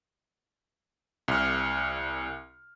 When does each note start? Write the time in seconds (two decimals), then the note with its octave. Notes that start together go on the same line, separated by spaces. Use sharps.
1.28 C2 F6